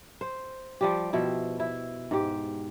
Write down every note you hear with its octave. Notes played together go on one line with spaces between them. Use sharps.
C5
F3 G3 G4
B2 F3 E4
E4
G#2 G4